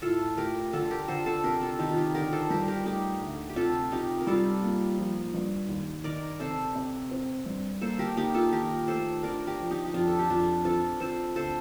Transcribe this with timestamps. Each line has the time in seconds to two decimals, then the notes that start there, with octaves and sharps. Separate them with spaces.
0.02 A2 F4 A4
0.37 A3 G4 A#4
0.73 D3 F4 A4
0.91 G4 A#4
1.08 D3 A4 C5
1.26 A4 C5
1.44 C3 G4 A#4
1.61 F4 A4
1.79 D#3 D#4 G4
1.89 F4
1.97 D#4 G4
2.14 D3 G4 A#4
2.32 A4 C5
2.50 G2 G4 A#4
2.68 G4 A#4
2.85 A3 D#4 G4
3.21 D2
3.50 G4
3.56 C3 F4 A4
3.92 C3 D#4 G4
4.21 A#4
4.27 G3 F4 A4
4.63 A#3
4.98 F3
5.34 G2
5.68 D#2
6.04 D#3 A#4 D5
6.40 C3 A4 C5
6.75 C3
7.11 C4
7.46 G2
7.81 A#3 A4 C5
7.99 G4 A#4
8.16 A#3 D#4 G4
8.34 F4 A4
8.52 D#3 G4 A#4
8.88 A3 A4 C5
9.23 D4 A#4 D5
9.47 G4 A#4
9.59 F3
9.70 D#4 G4
9.85 G4
9.94 F2 D4 F4
10.08 A4
10.19 G4
10.30 F2 D4 F4
10.65 C4 F4 A4
11.00 C4 A4 C5
11.35 D2 A4 C5